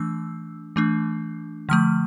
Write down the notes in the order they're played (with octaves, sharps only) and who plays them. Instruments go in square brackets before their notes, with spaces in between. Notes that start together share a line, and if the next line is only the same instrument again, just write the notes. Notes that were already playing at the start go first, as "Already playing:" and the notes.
Already playing: [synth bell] E3 A3 D4 E6
E3 A3 D4
D3 F3 A3 F6